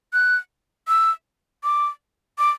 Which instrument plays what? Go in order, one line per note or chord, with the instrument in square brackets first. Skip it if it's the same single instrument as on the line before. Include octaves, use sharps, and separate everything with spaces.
[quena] F#6
E6
D6
D6